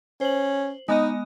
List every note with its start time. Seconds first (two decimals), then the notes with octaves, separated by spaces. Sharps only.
0.21 C#4 C5 F#7
0.88 G#3 B3 D#4 D#5